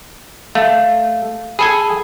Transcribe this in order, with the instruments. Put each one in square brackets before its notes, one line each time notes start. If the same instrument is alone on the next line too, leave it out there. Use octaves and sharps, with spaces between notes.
[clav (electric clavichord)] A3 [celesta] F5
[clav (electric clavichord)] G#4 A4 G#5 [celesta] B5